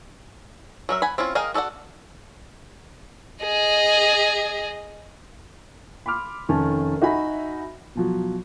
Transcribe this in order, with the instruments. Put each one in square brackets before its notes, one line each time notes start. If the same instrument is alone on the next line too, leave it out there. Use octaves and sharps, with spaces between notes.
[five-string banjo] F#3 A#4 E5
F#5 G#5 B5
C4 C#4 E4 F4
G#4 A#4 D#5 F5 G5
F#4 A4 D5 D#5 F#5
[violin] G#4 D#5
[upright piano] B5 C6 D6 F6
F1 D#3 C#4 A5
D#4 F#4 E5 G#5 B5
B2 F3 F#3